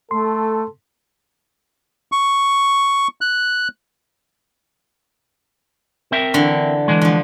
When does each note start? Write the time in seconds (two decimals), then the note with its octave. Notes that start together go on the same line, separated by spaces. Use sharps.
0.11 A3 A4 C6
2.12 C#6
3.21 F#6
6.12 C4 A#4 E5
6.34 D3 E3
6.88 E3 G#3
7.01 D3 F3